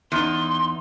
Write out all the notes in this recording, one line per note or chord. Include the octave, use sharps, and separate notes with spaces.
E2 D#4 C6